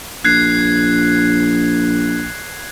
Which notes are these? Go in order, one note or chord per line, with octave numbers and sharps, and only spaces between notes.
A#1 F#6 G#6 C7